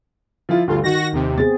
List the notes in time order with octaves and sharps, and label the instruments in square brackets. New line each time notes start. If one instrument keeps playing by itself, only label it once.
[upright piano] F3 E4 F4
[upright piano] D2 G2 A4 [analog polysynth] F4
[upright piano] D#3 [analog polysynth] F#4 A#6
[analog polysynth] D#2 C3
[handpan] B3 C4 G#4 [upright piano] A6